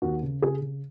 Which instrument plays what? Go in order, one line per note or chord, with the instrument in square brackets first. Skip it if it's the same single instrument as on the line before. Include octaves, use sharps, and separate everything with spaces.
[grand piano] D#2 F#4
C#3
C#3 G#4
C#3